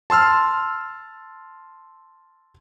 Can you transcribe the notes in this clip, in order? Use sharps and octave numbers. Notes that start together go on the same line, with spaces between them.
A5 C6 E6 F6